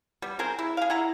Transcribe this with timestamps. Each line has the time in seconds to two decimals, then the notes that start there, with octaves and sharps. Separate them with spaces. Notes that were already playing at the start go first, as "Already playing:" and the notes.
0.22 G3 B3
0.39 C4 G#4 A#4 C5
0.59 E4
0.77 G#4 F5
0.90 E4 F#5 A#5